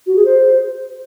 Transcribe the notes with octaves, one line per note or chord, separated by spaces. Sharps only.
F#4
G#4
C5